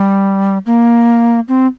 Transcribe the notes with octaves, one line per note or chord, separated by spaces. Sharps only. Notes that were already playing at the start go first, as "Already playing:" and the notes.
Already playing: G3
A#3
C4